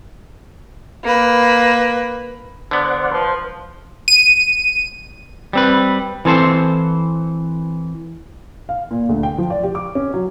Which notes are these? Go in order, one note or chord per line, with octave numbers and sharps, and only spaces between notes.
A#3 B4
D3 B3 C5 D5 F#5
F3 B4 C5
D#7
G3 C4 B4
E3 C4 A4 C5
F5
A#2
D2
G5
F3
D5
G4
D6
C#4
F#3